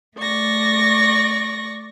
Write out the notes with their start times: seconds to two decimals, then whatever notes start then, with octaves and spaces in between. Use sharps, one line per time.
0.18 A3 D5 C#6 A#6